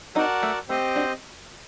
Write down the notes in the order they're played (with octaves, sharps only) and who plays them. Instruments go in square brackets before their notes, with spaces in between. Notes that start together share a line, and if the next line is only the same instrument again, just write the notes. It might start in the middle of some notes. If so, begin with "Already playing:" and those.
[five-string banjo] C4 D#4 [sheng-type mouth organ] F#4 A#4 D5 F#5 A5
[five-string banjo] A3
[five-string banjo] A3 [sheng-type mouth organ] C4 G4 C5 D#5
[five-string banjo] D4 F#4